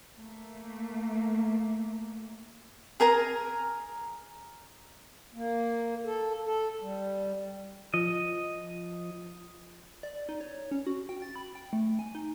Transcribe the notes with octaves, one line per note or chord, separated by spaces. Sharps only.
A3 A#3
G#4 A#4 G#5 A#5
A#3
A4
A4
G3
F3 D#5
D5
D#4
C#5
C#4
F#4
G5
A6
B5
G5
A3
G#5
D#4